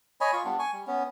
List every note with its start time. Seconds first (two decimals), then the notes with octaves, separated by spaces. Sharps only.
0.21 C#5 D#5 G#5 B5
0.33 F4 C#6
0.45 G3 B3 D4
0.59 G#5 C#6
0.73 G3
0.87 B3 C#4